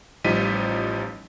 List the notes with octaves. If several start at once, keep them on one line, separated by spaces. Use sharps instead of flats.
A1 F3 G3 D#4 B6 D#7